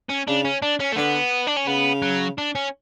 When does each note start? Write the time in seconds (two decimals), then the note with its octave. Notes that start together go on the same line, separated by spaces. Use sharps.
0.09 C#4
0.27 C#3 D4
0.45 C#4
0.62 D4
0.80 C#4
0.93 A3
0.97 D3 B3
1.47 D4
1.57 C#4
1.67 C#3 B3
2.02 F#3
2.38 D4
2.55 C#4